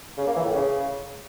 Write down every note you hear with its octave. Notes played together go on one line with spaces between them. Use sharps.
C#3
A#3
E3
A2
C#3